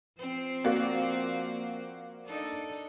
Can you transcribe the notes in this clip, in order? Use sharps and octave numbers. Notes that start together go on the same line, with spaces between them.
F3 C4 C5
A#3 F#4 D5
D4 D#4 A4